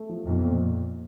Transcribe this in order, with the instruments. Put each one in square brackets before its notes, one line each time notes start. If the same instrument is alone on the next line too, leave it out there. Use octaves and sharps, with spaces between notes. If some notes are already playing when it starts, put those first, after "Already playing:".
Already playing: [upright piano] A3
F3
[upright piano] B1 [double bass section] F2
[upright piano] A#2